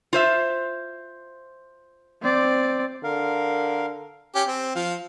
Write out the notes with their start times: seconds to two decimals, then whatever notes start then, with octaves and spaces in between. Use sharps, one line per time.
0.13 F4 C5 E5
2.22 C4 D5
3.04 D3 A#4 F5
4.35 C#4 G4
4.47 C4
4.76 F3 F5